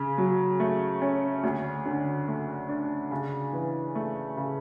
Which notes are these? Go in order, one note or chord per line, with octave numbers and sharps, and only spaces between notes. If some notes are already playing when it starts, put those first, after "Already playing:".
Already playing: C#3
F#3
A3
C#4
D2
D3
A3
D4
C#3
E3
A3
C#3